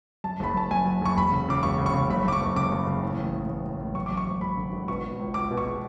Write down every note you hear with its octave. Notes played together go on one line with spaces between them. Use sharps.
F#2 A5
F#1 B5
F#1 A5
F#2 G#5
F#2
F#1 C#6
E1 B5
C#3
C#3 D6
E1 C#6
C#3
C#6
C#3
F#1 B5
F#1 D6
C#6
F#1
C#3 D6
F#2
C#3
A2
A1
A1
A1
A1
A1
F#2 C#6
F#2 D6
C#6
G#1
G#1 B5
D3
G#1
B2 C#6
B2
C#2
C#2 D6
B2
C#6
G#3